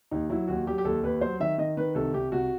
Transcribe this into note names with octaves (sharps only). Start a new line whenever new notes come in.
D#2 D#4
F#3 E4
D#2 F#4
F#3 G4
G4
D#2 A4
D#2 B4
F#3 C5
D#3 E5
D#3 D#5
D#3 B4
C2 A4
C2 G4
C2 F#4